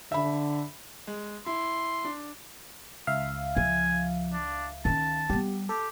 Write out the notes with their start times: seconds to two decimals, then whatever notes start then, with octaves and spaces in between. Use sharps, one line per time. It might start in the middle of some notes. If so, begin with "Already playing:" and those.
0.12 D3 E5 B5
1.07 G#3
1.46 E4 C6
2.05 D4
3.07 C#2 E5 F5
3.57 F3 G#5
4.32 D4
4.85 D#3 C#4 A5
5.30 G3 B3 G4
5.69 G4 A4